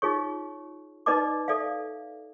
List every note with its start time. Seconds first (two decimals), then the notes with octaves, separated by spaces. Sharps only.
0.02 D#4 F4 G#4 C#5 C#6
1.06 D#4 B4 D5 D#5 A5 D6
1.48 A4 D5 E5 F5